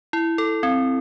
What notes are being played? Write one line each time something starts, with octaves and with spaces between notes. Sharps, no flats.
E4
A4
C4